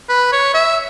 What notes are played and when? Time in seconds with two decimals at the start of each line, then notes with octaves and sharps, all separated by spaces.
0.09 B4
0.32 C#5
0.54 E5